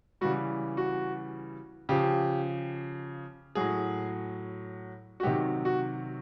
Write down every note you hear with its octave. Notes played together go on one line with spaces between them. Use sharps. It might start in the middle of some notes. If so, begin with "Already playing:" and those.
C#3 E3 G3 F#4
F#4
C#3 F3 G4
A2 F#3 G#4
F#4
C3 D#3 F#3 G4
F#4